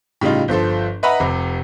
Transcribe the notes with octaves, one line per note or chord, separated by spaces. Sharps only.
A2 C#3 G3 D#4 F4
G1 F3 A4 C5
B4 D#5 E5 F#5 A#5 B5
F1 C3